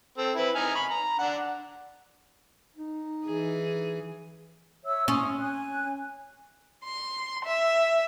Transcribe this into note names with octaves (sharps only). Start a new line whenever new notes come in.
C4 A4
E4 B4
D#4 G#5 F6
B5 C#6
A#5
D4 F#5
D#4
E3 G#4
C#5 E5 E6
C#4 C6 C#6 D#6
G#5 F#6
C6
E5